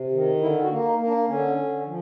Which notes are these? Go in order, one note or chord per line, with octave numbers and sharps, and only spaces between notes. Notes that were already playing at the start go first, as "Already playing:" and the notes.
Already playing: C3
D#3
D3 E4
F#4
A#3
D#4
A#3
D4
D3 C#4
D3
F3